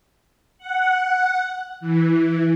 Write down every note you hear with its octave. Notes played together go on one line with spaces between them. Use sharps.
F#5
E3